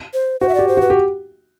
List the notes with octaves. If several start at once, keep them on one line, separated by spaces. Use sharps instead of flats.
C5
F#4 C5
E5
G4 D5
C5
F#4 B4
G4